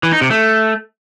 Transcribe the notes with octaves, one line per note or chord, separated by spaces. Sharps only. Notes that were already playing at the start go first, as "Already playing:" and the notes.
E3
D#4
C3
A3